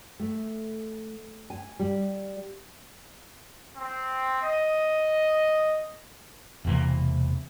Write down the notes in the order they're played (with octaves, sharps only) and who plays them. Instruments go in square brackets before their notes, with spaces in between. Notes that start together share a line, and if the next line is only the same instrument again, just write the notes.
[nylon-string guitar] A3
G#5
G3
[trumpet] C4
D#5
[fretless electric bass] E1 C3 E3 A#3